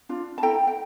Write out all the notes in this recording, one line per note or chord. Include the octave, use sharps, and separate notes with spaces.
D4 F4
A5
E4 A4 G5 A#5
G5